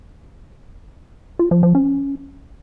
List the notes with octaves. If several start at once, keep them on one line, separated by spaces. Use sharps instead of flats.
F4
F3
F3
C#4